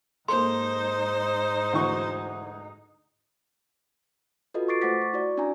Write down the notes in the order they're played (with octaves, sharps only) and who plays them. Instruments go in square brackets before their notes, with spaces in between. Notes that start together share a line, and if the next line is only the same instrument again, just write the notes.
[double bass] G#2 D#4 [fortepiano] A#3 A4 [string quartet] C5 [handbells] C6
[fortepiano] D2 E3 C#6
[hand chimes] F4 F#4 A4 B4 D#5
C#6 D6 A6 C7 D7
A3 C5 F#5 D6 A6 B6
C#6
E4 F#4 D5
C#4 D4 E4 F#4 G#5 A#5